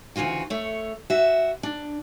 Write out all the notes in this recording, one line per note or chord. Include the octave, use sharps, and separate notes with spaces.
D2 C#3 E3 F4 F#4
A3 C#5
F#4 E5
D4